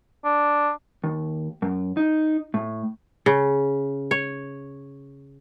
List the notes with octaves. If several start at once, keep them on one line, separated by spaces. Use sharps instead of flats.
D4
D#2
F#2
D#4
A2
C#3
C#5